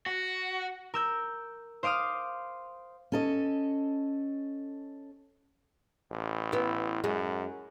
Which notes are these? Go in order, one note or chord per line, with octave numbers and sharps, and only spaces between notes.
F#4
A#4 E6 G6
C5 F5 D6 D#6 F6
C#4 A4 D#5
A1
B3 E4
F#2 G#3